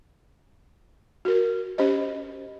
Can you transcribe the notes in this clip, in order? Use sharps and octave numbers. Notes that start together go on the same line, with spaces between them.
F#4 A#4
C#4 G4 C5 D#5